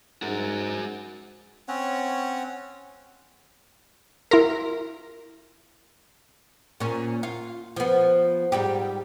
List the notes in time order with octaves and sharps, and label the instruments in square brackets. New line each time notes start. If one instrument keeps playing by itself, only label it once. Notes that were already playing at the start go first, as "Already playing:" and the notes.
[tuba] G#2 [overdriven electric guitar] F#4 A#4
[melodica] C4 C#4 C#5 F#5
[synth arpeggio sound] E4 C6 A#6 [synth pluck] A#4
[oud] A#2 C#4
F4
F3 B3
G#2 G3 G4